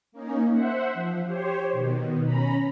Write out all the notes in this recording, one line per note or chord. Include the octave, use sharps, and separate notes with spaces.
A#3 C#4 D#4
C5 E5 F#5
F3
G4 C5 C#5
B2 D#3
C#4 A#5 B5